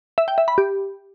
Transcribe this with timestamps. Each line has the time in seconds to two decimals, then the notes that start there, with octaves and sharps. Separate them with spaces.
0.18 E5
0.28 G5
0.38 E5
0.48 B5
0.58 G4